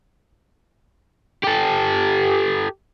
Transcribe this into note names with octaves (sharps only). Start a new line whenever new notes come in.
G4 A4